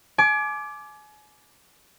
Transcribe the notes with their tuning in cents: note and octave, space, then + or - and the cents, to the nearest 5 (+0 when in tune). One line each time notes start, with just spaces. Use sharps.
G#5 +35 D6 +0